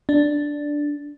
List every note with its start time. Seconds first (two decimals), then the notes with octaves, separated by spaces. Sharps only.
0.09 D4